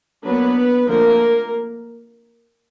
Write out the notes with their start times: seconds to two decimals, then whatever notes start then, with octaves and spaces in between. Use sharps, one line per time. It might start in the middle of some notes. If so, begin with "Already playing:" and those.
0.23 F#3 A#3 B3 D4 B4
0.88 D3 F3 A3 A#3 C4 A#4